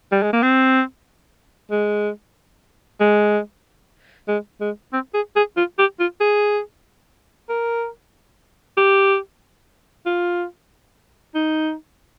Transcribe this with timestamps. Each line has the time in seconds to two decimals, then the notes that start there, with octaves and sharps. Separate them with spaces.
0.12 G3
0.23 G#3
0.33 A#3
0.43 C4
1.71 G#3
3.01 G#3
4.28 G#3
4.61 G#3
4.93 C4
5.14 G#4
5.36 G#4
5.57 F4
5.79 G4
6.00 F4
6.21 G#4
7.49 A#4
8.78 G4
10.06 F4
11.35 D#4